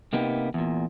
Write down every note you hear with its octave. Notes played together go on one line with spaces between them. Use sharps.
C3 A#3 B3 D#4 G4
E2 A#2